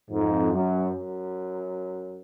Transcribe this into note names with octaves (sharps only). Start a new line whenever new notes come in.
F2 G#2
F#2
F#2